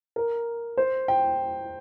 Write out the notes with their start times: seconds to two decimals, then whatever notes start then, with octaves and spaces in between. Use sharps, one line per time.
0.16 A#4
0.77 C5
1.08 G5